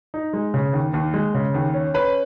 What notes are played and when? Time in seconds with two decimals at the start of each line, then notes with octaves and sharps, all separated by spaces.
0.14 D#4
0.33 G#3
0.54 C#3
0.73 D#2
0.94 D#2
1.14 G#3
1.34 C#3
1.54 D#2
1.74 C#4
1.94 C#4 B4 B5